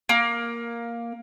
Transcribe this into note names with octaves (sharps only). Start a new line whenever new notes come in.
A#3